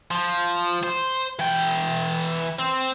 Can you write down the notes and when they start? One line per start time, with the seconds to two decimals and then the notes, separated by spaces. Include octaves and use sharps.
0.11 F3
0.83 C5
1.39 E3 G5
2.59 C4